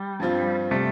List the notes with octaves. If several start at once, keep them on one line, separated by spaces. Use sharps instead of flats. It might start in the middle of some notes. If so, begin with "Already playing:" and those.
Already playing: G3
G2 F3 C4 F4
C3 G3 A3